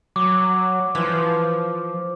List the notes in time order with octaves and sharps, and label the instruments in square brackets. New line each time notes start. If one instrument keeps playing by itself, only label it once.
[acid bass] F#3 [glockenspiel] D6
[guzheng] E3 F4 [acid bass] F3